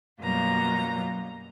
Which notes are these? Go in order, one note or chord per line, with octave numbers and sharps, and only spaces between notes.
F#2 B2 G3 A#3 F4 A#5